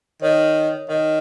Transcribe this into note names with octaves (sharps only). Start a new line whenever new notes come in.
D#3 C#5
D#3 D#5